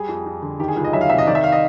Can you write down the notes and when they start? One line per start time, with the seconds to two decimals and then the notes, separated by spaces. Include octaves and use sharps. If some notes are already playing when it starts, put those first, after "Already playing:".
Already playing: G3 G#4
0.09 F2
0.26 F2
0.42 D3
0.59 D#3 G4
0.68 G#4
0.76 C#2
0.84 D#5
0.93 F#3 E5
1.01 F5
1.10 C3 E5
1.18 D#5
1.27 D#3 D5
1.35 E5
1.44 F5
1.52 D#5